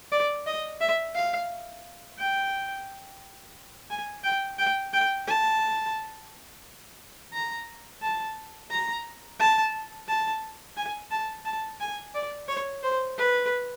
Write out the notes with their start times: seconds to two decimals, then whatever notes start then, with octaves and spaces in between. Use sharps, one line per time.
0.12 D5
0.47 D#5
0.81 E5
1.15 F5
2.19 G5
3.90 G#5
4.24 G5
4.59 G5
4.93 G5
5.28 A5
7.33 A#5
8.02 A5
8.70 A#5
9.40 A5
10.08 A5
10.77 G#5
11.11 A5
11.45 A5
11.81 G#5
12.15 D5
12.48 C#5
12.83 C5
13.18 B4